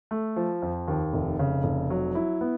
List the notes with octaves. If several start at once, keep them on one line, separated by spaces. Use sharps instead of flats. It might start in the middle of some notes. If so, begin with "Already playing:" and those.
A3
F3
F2
D#2
F1
C#3
F1
F#3
E4
B3